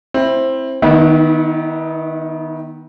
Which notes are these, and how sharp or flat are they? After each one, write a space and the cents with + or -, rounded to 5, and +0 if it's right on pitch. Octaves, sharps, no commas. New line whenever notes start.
C4 +15 E4 +0
D#3 +0 B3 -20 E4 -40